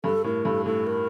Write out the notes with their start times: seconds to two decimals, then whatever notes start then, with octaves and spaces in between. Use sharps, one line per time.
0.04 G2 A4
0.24 A2 A#4
0.45 G2 A4
0.65 A2 A4
0.87 A#4